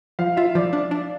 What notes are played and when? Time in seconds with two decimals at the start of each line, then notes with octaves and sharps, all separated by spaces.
0.19 F3 F5
0.37 F4 E5
0.55 F3 D5
0.73 D4
0.91 D4